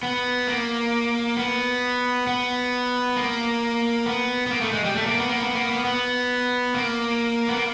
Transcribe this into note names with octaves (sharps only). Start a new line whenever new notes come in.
B3
A#3
B3
B3
A#3
B3
B3
A#3
A3
G#3
G3
A3
A#3
B3
A#3
B3
A#3
B3
B3
A#3
B3
A#3